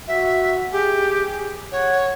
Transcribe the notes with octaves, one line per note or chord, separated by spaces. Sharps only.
F#4 E5
G4 G#4
C#5 F#5